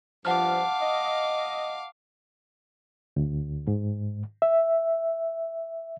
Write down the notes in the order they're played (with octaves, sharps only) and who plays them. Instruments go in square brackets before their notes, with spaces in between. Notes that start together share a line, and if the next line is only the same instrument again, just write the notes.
[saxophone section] G2 F3 [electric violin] F5 D6 [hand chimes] F#5 A5 F6
[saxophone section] D#5
[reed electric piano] D2
G#2
E5